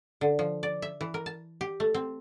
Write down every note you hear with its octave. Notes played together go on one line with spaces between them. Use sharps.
D3
F3
D5
E5
E3
A#4
A5
G4
A3
C4